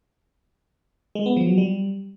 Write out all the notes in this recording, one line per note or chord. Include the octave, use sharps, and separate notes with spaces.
G#3
B3
F3
F#3
G3